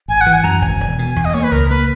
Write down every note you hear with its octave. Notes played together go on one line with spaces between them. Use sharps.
G#1 G#5
F#5
E3
G#5
F#2 A#5
G#1 G#5
E1
B2
E2 G#5
D#5
A#3 C#5
B4
C#2 A#4
A#3 B4